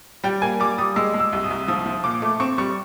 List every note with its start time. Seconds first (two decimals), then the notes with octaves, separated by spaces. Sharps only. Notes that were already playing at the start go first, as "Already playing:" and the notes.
0.24 G3 G5
0.42 A#3 G#5
0.60 G3 D6
0.78 G3 D#6
0.96 G#3 E6
1.14 G#3
1.20 E6
1.33 C2
1.44 D#6
1.50 C2
1.68 F3 D#6
1.86 F3
2.04 A#2 D6
2.22 A3
2.40 C4 C#6
2.58 G3 C#6